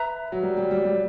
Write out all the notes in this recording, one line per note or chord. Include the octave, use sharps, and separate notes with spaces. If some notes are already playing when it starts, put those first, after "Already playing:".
Already playing: B4 E5 A#5
F#3
G3
G3
G3
G3